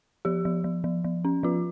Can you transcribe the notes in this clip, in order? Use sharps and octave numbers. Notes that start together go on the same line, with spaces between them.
F3 G4
F3
F3
F3
F3
C#4
F3 F4